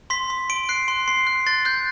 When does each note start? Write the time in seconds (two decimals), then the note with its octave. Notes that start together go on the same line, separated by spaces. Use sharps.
0.10 C6 B6
0.30 C6
0.50 C6 D7
0.69 F#6 C7
0.88 C6
1.08 C6 C7
1.27 F#6
1.47 C6 A6
1.65 F#6 G6